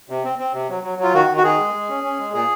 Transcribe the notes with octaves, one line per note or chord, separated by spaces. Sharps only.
C3
C4
C4
C3
F#3
F#3
F#3 F4
D#3 F#4
D#3
F#4
D#3 G#4
G#3
G#3
C#4
C#4
G#3
A#2 G#4